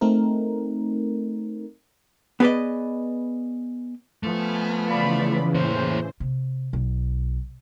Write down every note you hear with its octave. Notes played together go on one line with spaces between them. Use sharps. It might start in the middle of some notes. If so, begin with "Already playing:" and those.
A3 C4 D#4 A#4
B3 G#4 B4 D5 D#5
F3 A3 B3 G#5 B5 F6
C#3 E3 F4 D5 B5
A2 A#3 C5 C#5
C3
B1